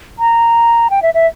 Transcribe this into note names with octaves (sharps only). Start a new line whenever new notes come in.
A#5
G5
E5
E5